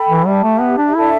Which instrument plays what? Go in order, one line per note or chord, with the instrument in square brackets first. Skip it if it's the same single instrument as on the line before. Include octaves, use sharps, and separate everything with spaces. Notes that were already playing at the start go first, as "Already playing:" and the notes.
Already playing: [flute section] A4 G5 B5
[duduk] E3
[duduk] G3 [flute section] G4 E5 A5
[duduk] A3
B3
D4
[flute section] D4 A4 E5 A5 [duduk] E4